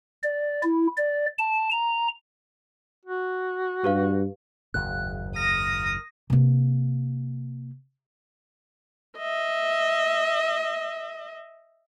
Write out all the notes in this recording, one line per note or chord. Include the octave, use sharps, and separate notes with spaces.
D5
E4
D5
A5
A#5
F#4
G2 G4 B4 F5
F#1 D#2 G#2 F#6
A#4 D#6 A#6
C3 A#3
D#5 E5